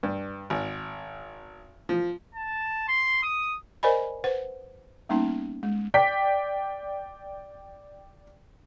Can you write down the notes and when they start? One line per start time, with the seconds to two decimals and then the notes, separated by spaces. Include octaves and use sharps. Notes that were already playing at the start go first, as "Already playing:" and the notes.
0.03 G2
0.50 G#1
1.89 F3
2.34 A5
2.88 C6
3.23 D#6
3.83 A#4 C5 D5 D#5 G#5 B5
4.24 B4 C5 F#5
5.09 G3 A#3 B3 C#4 D#4
5.63 G#3
5.94 D5 G5 B6